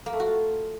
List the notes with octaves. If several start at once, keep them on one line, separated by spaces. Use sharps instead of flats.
A#3
A3
F#4
F4